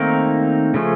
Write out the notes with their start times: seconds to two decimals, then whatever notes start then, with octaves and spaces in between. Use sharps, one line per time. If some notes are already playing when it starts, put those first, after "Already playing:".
Already playing: D#3 A3 A#3 C4 D#4 A#4
0.74 C#3 F3 A3 C#4